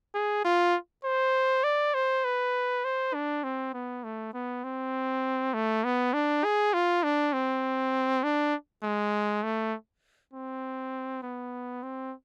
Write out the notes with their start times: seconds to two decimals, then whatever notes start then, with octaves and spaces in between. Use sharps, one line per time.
0.14 G#4
0.45 F4
1.04 C5
1.64 D5
1.94 C5
2.24 B4
2.84 C5
3.14 D4
3.44 C4
3.73 B3
4.04 A3
4.34 B3
4.64 C4
5.54 A3
5.84 B3
6.13 D4
6.44 G#4
6.74 F4
7.03 D4
7.33 C4
8.23 D4
8.83 G#3
9.43 A3
10.33 C4
11.23 B3
11.82 C4